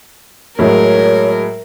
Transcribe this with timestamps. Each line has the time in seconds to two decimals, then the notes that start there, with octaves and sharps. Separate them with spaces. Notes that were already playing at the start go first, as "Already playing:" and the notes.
0.59 A2 F#3 G#3 A#4 C#5